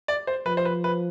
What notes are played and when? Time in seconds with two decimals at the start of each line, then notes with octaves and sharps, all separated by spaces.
0.08 D5
0.27 C5
0.46 F3 B4
0.57 C5
0.65 B4
0.84 B4